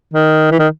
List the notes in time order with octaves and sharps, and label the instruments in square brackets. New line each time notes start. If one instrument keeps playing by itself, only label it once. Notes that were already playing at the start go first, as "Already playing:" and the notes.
[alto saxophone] D#3
E3
D#3